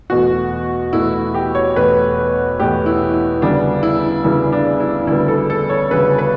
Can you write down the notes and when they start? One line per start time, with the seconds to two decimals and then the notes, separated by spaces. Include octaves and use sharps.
0.10 E2 B2 A3 F#4
0.93 E2 B2 A3 E4
1.13 E4
1.34 G4
1.55 C#5
1.76 E2 B2 A3 B4
2.59 E2 B2 A3 G4
2.86 E4
3.14 E4
3.42 D2 C#3 G3 B3 D4
3.83 E4
4.24 D2 C#3 G3 B3 E4
4.52 D4
4.80 E4
5.07 D2 C#3 G3 B3 E4
5.28 A4
5.50 A4
5.70 C#5
5.91 D2 C#3 G3 B3 B4
6.18 B4